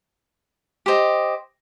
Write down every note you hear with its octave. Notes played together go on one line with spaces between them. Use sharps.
G4 C5 D#5